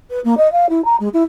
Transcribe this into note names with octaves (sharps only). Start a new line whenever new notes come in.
B4
A#3
D#5
F5
E4
A#5
G#3
E4